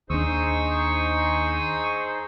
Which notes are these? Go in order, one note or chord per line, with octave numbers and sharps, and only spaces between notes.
D#2 D4 D#4 G#4 C5 C#6 D#6 E6